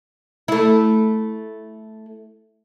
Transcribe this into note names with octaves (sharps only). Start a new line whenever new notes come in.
A3 E4